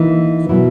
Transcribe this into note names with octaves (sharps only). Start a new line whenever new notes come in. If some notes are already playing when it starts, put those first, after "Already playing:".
Already playing: E3 A#3 D#4
B2 F#3 B3 E4